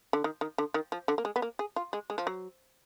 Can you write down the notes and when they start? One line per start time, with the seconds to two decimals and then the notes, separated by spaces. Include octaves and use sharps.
0.13 D3
0.24 D#3
0.41 D#3
0.58 D3
0.74 D#3
0.92 F3
1.08 D3
1.18 A#3
1.25 G#3
1.36 B3
1.42 A#3
1.59 G#4
1.76 F4
1.93 G#3
2.10 G#3
2.18 F3
2.27 F#3